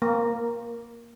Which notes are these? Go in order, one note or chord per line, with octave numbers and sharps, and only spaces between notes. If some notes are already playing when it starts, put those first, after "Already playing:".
A#3